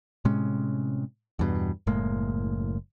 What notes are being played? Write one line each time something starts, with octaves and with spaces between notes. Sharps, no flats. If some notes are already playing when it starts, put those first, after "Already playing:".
A2 C3 G#3 C#4
E2 G2 B2
F#1 A2 G#3 A#3